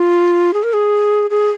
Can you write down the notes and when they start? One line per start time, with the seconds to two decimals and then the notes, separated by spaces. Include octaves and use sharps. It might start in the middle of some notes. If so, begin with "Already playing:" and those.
Already playing: F4
0.54 G#4
0.63 A#4
0.73 G#4
1.30 G#4